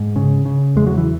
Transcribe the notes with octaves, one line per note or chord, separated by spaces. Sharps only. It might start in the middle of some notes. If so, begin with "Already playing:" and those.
Already playing: G#2
C#3
C#3
E2 G#3
F#3
E3